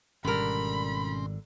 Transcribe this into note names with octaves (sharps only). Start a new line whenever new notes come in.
G#1 B2 D3 G3 C#4 A#4 B5 C6